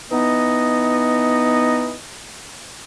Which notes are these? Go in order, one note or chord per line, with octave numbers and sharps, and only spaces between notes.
E3 B3 D#4 D#5